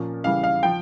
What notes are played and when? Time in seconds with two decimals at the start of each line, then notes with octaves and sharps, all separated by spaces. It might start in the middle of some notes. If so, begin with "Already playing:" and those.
Already playing: A#2 F3 A#3 C#4
0.24 C#3 E3 G3 F5
0.44 F5
0.63 F3 G5